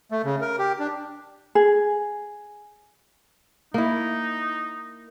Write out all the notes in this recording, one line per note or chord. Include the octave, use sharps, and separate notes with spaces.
A3
C#3
A#4
G4
D4
G#4
A#3 D#4 E4